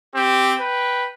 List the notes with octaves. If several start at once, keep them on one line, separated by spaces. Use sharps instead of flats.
C4 G4
B4 G5